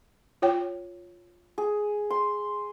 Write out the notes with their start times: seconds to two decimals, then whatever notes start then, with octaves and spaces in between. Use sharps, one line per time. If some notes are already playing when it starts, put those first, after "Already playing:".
0.42 F4 C#5 G5
1.58 G#4
2.10 C6